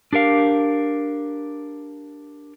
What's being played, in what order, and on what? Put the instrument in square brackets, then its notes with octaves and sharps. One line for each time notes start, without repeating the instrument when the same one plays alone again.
[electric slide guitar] D4 G4 A#4 F5